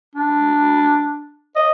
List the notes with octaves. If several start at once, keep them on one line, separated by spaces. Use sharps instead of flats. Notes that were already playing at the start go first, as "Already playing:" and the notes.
D4
D#5